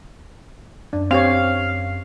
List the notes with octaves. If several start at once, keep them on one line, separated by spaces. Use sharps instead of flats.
F#2 D4
C4 G4 C#5 F5